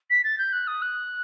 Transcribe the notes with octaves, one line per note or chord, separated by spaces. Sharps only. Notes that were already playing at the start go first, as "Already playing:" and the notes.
B6
A6
G6
F#6
D#6
F#6